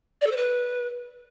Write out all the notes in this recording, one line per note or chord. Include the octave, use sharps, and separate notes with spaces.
D5
A4
C5
B4